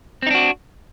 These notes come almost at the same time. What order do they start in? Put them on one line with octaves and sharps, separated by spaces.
C4 D#4 D4 F#4